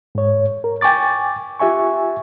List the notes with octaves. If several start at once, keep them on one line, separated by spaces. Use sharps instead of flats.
G#2 C#5
A#4
G5 G#5 C#6 D6 A6
F4 G4 E5 G#5 C#6